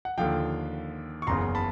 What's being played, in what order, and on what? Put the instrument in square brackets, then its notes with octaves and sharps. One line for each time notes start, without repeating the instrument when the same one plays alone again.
[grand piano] F#5
D#2 D3 F3 F5 G5
C#6
F#1 E2 C#3 A#5 C6
A5 B5